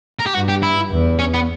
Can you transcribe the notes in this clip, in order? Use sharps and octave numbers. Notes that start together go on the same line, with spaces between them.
A#4
G4
G2 F#4
G4
E4
E2
C#4
B3